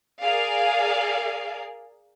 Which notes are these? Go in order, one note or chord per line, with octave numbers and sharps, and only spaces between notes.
G#4 A#4 D5 F5